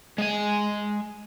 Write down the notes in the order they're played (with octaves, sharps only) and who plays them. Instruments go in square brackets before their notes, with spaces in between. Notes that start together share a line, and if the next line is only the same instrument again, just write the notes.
[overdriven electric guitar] G#3 G#5